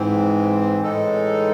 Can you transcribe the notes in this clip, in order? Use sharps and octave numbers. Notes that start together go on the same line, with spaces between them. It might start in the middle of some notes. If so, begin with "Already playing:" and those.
Already playing: G#2 E3 C4
A2 E3 G#3 D#4 A4